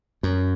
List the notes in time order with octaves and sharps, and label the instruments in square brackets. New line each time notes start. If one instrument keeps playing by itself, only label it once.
[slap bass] F#2